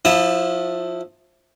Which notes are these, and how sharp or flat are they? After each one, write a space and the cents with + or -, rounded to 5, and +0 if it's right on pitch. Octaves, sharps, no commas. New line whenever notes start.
F3 +25 E4 +0 D#6 -25